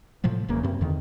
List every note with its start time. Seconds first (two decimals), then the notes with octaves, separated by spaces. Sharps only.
0.24 A2 C3 F3 F#3
0.49 E1 E2 C#3 A#3
0.63 F#2 C4
0.81 E2 D3 D#3